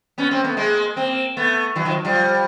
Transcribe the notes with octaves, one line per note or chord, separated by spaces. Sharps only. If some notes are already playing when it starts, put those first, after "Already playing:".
B3 C#4
A#3 C4
A3 B3
G#3 A#3
A#3 C4
A3 B3
E3 F#3
D#3 F3
F3 G3